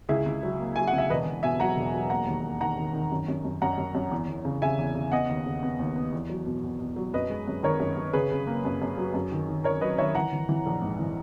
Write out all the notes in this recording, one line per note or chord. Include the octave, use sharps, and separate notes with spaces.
C#2 E4 G#4
C#2
F#3
A#3
F#3 G#5
F#5
C#3
E5
E1 B4 D#5
E1
B2 E5 G#5
F#3 F#5 A#5
E1
F#3
A#3 F#5 A#5
D#2
A#3
D#3 F#5 A#5
D#3
D#3
F#2
F#2
F#2
F#2 F#5 A#5
F#2
F#2
E2
E2
C#3
C#3 E5 G#5
E2
C#3
B3 D#5 F#5
D#2
C#3
B3
D#2
B3
E2
F#3
B2
B2
B2
F#3
F#2 B4 D#5
G#3
F#2
D#3 A#4 C#5
F#2
F#2
C#3 G#4 B4
C#3
A#3
F#2
F#2
F#3
F#2
D#3
D#3
D#3 A#4 C#5
F#3 B4 D#5
D#3 C#5 E5
E3 F#5 A#5
E3
E3
A#1
G#2
E3